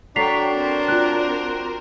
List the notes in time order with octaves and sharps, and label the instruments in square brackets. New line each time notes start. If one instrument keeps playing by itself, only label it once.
[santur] F#3 [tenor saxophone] D4 [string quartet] A4 C#5 G5 [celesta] B6 C7 F7
[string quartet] C4 A#4 C5
[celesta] F4 F#6